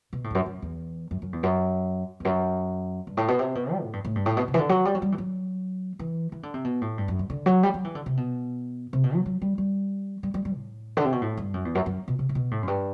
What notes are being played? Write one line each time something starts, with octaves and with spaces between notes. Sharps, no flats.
B2
A2
E2
F#2
F#2
E2
F#2
F#2
E2
F#2
E2
F#2
G2
A2
B2
C3
B2
G3
A2
G2
A2
G2
A2
B2
C3
E3
D3
F#3
G3
F#3
G3
E3
F#3
E3
E3
D3
C3
B2
A2
G2
F#2
G2
D3
F#3
G3
F#3
E3
D3
C3
B2
C3
B2
F#3
F#3
G3
G3
G3
G3
G3
A2
D3
C3
B2
A2
G2
F#2
E2
F#2
F#2
B2
C3
C3
B2
A2
F#2
G2